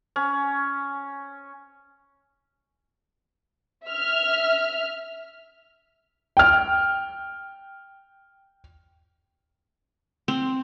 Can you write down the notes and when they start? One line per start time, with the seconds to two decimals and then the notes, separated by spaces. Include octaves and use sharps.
0.16 C#4
3.85 E5 F6
6.37 G5 F6
10.28 C4